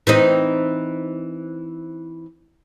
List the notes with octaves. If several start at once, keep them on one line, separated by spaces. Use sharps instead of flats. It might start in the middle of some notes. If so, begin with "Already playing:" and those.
E3 C4 D#4